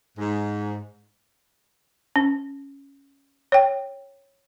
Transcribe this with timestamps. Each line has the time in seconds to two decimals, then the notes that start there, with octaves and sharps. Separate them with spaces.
0.18 G#2
2.16 C#4
3.52 C#5 G5